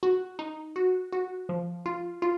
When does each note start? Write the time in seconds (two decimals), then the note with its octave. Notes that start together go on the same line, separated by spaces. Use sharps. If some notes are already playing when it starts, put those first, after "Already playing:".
0.03 F#4
0.39 D#4
0.76 F#4
1.13 F#4
1.49 F3
1.86 F4
2.22 F4